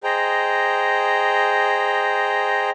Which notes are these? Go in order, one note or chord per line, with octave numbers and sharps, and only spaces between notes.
G#4 C5 D#5 G5 A#5